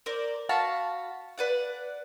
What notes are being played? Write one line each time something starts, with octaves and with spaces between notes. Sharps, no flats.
A#4 C5 D5
F#4 F5 A5 B5
B4 D5 F#5